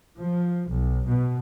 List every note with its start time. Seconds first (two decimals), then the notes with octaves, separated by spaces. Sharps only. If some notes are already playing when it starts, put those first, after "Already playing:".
0.18 F3
0.71 B1
1.06 B2